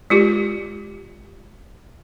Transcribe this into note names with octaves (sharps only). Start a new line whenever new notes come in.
G#3 F4 G4